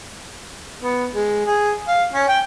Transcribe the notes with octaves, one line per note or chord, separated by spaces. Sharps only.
B3
G#3
G#4
F5
C#4
G5